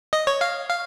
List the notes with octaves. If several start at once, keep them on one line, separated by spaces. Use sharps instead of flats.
D#5
C#5
F5
F5